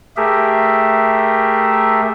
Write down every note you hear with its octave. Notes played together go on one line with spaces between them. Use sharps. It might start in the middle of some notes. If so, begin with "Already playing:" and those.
A3 G4 G#4 A#4 E5